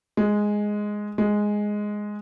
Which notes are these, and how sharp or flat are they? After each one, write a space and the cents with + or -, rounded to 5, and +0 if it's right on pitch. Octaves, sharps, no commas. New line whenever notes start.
G#3 +0
G#3 +0